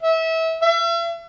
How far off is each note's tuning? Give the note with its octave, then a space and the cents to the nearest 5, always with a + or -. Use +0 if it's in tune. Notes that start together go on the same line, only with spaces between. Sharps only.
E5 -25
E5 +40